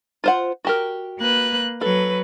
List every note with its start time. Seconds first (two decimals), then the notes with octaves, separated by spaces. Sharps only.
0.24 F4 C5 F#5
0.65 F#4 G4 A#4
1.20 A#3 B4 F#6
1.81 F#3 A4 B4